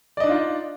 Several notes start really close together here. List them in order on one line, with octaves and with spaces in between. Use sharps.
D5 D#5 D4 D#4 F4